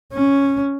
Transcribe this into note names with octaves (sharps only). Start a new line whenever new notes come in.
C#4